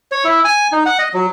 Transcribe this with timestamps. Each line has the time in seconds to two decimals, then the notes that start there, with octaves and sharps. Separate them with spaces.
0.12 C#5
0.24 E4
0.44 G#5
0.72 D#4
0.86 F#5
0.99 D#5
1.14 F#3